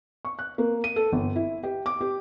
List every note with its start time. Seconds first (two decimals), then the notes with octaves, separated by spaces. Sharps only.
0.25 C#6
0.39 F#6
0.58 A#3
0.84 D#7
0.96 A4
1.12 G1
1.36 E4
1.63 G4
1.86 D6
2.01 G4